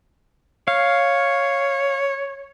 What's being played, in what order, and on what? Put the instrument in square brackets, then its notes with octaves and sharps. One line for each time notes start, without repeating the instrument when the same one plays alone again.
[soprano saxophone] C#5 [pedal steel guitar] F5